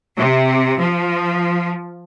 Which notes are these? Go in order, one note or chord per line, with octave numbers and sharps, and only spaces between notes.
C3
F3